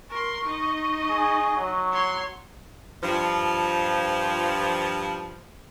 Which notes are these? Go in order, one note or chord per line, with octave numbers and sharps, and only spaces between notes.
A#4 C6 C#6
D#4 D#5
G#4
F#3
C#5 C6
G2 F3